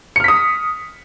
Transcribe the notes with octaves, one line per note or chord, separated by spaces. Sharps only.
D#6 F6 B6 C#7